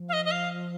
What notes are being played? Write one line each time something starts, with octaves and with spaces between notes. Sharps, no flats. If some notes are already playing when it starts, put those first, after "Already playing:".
Already playing: F3
F5
D#5
D#5
F5